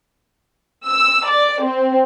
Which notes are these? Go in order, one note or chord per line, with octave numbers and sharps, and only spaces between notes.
E6
D5
C4